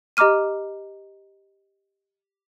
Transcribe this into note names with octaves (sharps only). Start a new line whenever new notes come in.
G4 D#5 A#5 D6 F6 D#7